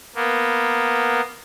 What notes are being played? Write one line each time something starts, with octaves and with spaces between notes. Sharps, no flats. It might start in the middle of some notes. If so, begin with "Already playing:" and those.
A#3 B3